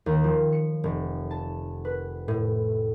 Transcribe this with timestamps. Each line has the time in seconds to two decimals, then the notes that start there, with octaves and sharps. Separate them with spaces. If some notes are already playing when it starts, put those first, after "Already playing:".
0.06 D#2
0.24 F3
0.52 C#7
0.84 F1
1.31 A5
1.85 B4
2.28 A2